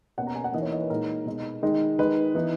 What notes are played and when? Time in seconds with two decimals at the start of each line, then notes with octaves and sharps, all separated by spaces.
0.18 B2 A#3 C#4 F#5
0.27 A#5
0.35 G#5
0.44 F#5
0.53 E3 A#3 D#4 D#5
0.62 C#5
0.72 D#5
0.81 B4
0.90 A#2 G#3 D#4 A#4
1.26 B2 G#3 D#4
1.62 D#3 G#3 D#4
1.98 D#3 G#3 D#4 B4
2.35 E3 B3 D#4